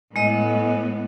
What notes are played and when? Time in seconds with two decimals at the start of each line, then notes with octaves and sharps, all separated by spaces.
0.16 A2 G#3 B3 D#5